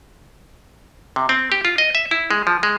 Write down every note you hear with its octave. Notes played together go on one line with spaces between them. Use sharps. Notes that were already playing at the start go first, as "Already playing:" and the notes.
C3
C4
G4
F4
D#5
E5
E4
G#3
F3
G#3